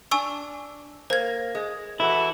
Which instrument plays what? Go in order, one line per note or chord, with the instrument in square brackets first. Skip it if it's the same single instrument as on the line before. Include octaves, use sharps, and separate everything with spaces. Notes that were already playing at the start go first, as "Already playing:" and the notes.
[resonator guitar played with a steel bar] D4 [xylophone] G#5 C#6 E6
[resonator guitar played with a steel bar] A#3 [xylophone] C5 G#6
[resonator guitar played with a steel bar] G#3
[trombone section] E3 F#4 A4 [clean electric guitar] E4